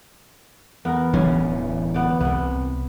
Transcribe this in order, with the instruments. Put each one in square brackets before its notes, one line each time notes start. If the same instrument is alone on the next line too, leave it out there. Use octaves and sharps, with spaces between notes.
[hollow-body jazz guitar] E2 [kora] B3 A#4
[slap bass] D1 E3 D4 [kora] C#4
[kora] B3 D5
[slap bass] C2 C3 [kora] B3